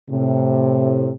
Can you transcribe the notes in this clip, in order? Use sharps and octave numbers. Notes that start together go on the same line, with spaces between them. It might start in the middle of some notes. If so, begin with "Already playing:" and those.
A2 C3